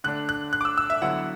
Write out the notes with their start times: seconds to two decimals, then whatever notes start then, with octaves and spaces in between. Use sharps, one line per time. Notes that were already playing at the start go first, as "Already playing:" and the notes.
0.04 D3 A3 D4 F#6
0.29 F#6
0.53 F#6
0.61 D6
0.65 E6
0.78 E6
0.90 E5
1.02 D3 F#3 B3 E4 F#5